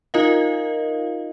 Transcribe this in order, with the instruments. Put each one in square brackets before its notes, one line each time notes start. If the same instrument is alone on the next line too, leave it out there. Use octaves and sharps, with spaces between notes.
[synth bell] D#4 F4 A#4 D#5 F5